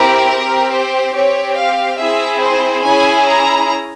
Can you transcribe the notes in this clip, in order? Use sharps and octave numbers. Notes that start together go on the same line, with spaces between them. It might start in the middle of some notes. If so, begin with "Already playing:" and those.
Already playing: C4 E4 G4 A#4
C4 G4
C5
C4 G4 C#5
F5
C4 E4 G#4 E5
C5
C#4 E4 G#4 G#5
A#5